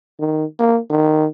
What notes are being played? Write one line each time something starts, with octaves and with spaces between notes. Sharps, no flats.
D#3
A#3
D#3